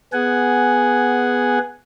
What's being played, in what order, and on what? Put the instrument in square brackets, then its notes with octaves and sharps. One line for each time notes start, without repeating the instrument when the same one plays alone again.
[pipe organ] B3 G#4 F#5 G#5